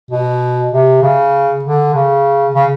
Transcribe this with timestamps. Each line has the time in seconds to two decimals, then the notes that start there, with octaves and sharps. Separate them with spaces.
0.11 B2
0.72 C3
1.02 C#3
1.63 D3
1.94 C#3
2.54 C#3